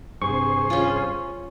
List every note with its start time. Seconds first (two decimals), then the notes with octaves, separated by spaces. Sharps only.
0.22 G2 C3 G#4 C5 C#6
0.70 C#4 F4